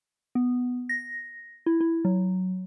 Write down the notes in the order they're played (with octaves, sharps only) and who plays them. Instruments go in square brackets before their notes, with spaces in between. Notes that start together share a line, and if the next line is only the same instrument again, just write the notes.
[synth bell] B3
A#6
E4
E4
F#3